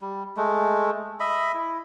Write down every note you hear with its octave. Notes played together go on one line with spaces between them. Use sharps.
G3
G#3 A3
D#5 E5 B5
E4